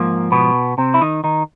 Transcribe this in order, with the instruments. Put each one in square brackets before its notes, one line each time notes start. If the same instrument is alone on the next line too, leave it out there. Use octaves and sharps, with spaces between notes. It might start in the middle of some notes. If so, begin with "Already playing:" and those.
Already playing: [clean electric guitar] G#2 F3 A#3
B2 B3
C3 C4
E4
D#3 D#4
D#3 D#4